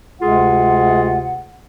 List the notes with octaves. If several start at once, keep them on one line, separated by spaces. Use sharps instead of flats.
D2 C3 G#3 F4 G#4 F#5